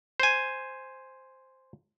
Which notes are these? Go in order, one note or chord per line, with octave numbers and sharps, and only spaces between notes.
C5 G#5